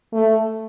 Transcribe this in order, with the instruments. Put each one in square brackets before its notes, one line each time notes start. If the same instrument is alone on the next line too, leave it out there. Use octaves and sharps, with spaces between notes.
[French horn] A3